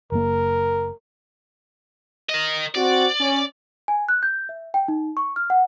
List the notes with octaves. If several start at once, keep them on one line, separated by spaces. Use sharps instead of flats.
F#1 A#3 A#4
A#4 D#5
C4 F#4 D5
C#4
G#5
F#6
G6
E5
G5
D#4
C#6
F6
F#5